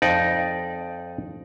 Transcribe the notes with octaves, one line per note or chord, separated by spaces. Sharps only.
F2 D#4 D5